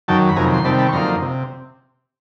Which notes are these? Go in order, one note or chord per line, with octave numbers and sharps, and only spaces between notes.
F#2 D#3 F#3 G5 A5
B5
F2 C3 D#3 F#3 G#5 A#5
C6
C3 D#3 G3 C4 A5 B5
A5 B5
C#6
F#2 D3 F3 A#3 D#4 A#5 C6
C3